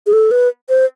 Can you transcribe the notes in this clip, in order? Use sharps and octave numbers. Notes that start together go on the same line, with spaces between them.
G#4
A4
B4
C5